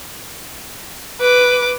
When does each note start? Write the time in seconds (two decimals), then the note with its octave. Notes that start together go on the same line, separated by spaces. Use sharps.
1.21 B4 D6